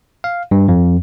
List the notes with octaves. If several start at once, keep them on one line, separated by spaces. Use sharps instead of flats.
F5
G2
F2